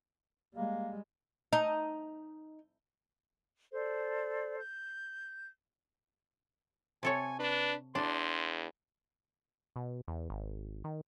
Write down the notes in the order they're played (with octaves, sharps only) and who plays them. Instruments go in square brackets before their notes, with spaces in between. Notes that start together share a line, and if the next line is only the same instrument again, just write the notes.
[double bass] G3 G#3 [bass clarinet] A#3
[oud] D#4
[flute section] A4 C5 D5
G6
[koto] C3 A4 C#5 [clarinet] G#5
[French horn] D4 [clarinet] B4
[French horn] E2 [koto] D4 [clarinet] C6
[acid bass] B2
E2
G#1
D#3